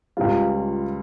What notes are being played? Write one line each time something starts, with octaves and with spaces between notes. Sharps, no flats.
C#2 C#3 G3 F4